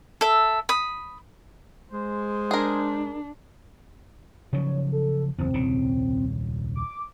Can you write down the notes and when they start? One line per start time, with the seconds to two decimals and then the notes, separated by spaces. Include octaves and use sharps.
0.21 A4 E5
0.69 B5 D#6
1.91 G#3 C5
2.51 D4 G#4 A#4
4.53 C#3 F3 F#3 C#5
4.92 A4
5.38 F#1 E2 C4
5.54 D#1 C2 C#3
6.75 D6